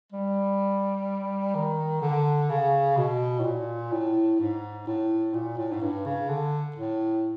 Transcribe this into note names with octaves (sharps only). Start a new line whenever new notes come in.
G3
D#3
D3
C#3
B2
A2
A#2
A2
G#2
A2
A#2
A2
G#2
G2
C#3
D3
A2